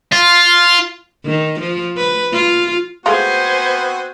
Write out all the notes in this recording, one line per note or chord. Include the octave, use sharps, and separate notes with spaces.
F4
D#3
F3
B4
F4
G#3 A3 B3 C4 F4 F#4 C5 G#5